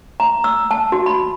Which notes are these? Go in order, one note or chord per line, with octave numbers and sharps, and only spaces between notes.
A#5
E6
A5
F#4
B5